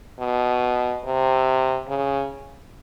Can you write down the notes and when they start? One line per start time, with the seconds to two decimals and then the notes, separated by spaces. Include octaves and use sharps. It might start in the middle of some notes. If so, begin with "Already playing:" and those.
0.20 B2
1.05 C3
1.88 C#3